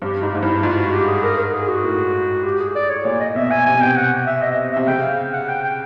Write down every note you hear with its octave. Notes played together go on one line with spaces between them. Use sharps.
G2 G4
G#2 D#4
G#2
G2 E4
G#2 F4
F#4
G4
G#4
A#4
A#4
G#4
F#4
A2
G4
G#4
D5
C#5
A#2 D5
D#5
B2 E5
G#5
C3 G#5
B2
C3 G5
F#5
E5
D#5
C3 E5
C#3 G5
F5
F#5
G5
G5